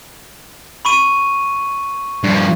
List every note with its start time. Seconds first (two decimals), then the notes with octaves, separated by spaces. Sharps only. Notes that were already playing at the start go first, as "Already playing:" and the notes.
0.85 B5 C#6 D#7
2.24 G2 F3